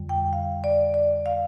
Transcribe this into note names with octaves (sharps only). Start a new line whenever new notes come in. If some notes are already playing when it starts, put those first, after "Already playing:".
Already playing: F2 D3 G3
G5
F5
D5
D5
F5